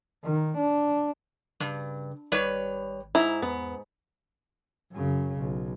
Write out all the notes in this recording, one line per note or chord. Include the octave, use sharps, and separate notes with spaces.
D#3
D4
G2 C#3
G#1 G3 B4 C#5
G#2 E4 A#5
E2 B3
F#2 C#3
B1